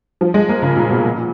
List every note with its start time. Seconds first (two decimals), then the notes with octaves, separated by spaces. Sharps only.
0.21 F3
0.34 G#3
0.49 A#3
0.62 C#3
0.76 A#2
0.90 B2
1.04 A#2